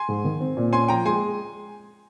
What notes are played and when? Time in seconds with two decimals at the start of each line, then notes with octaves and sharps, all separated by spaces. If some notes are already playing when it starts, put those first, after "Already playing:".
Already playing: G#5 C6
0.08 G#2
0.24 D#3
0.40 C4
0.57 A#2
0.73 C#4 G#5 C6
0.88 F3 G5 A#5
1.06 G#3 G#5 C6